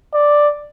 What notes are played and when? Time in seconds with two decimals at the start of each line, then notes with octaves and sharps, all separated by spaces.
0.14 D5